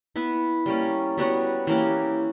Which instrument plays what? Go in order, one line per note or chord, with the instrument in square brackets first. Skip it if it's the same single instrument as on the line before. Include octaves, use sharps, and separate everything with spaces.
[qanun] B3 E4 B4
G3 A#3 C#4
G3 B3 F#4 C#5
E3 A#3 C#4 G4